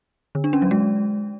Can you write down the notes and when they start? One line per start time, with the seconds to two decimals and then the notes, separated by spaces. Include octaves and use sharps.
0.35 D3
0.44 D4
0.53 C#4
0.62 F#3
0.71 G#3